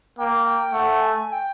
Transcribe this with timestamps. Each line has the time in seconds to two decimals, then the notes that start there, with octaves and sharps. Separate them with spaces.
0.18 A#3 G5
0.46 G5
0.73 A3 F#5
1.01 G#5
1.28 G#5
1.32 G5